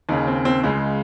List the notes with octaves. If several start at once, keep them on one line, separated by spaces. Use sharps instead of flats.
D#2 C#3 D#4
C4
C4
C#2 C#3 G#3